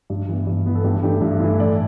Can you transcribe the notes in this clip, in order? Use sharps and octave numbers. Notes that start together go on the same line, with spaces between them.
G2
E3 B3
G2
E3 B3
A4
G2 G4
E3 A3 D4 G4
G2 E4
E3 A3 D4 E4
A2 A4 D5